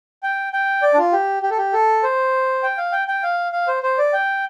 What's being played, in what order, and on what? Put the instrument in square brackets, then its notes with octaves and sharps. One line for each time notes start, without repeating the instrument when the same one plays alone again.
[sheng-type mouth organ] G5
G5
D5
D4
F4
G4
G4
A4
G4
A4
C5
G5
F5
G5
G5
F5
F5
C5
C5
D5
G5